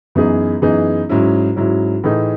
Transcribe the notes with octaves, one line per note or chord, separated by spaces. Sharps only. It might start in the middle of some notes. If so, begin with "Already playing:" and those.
F#2 E3 B3 D#4 G#4
F#2 E3 B3 D#4 G#4
G#2 F#3 C#4 E4
G#2 F#3 C#4 E4
A2 E3 A3 D#4 G#4